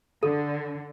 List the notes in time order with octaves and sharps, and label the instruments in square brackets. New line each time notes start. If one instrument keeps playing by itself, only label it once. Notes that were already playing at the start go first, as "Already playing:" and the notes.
[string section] D3 [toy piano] A4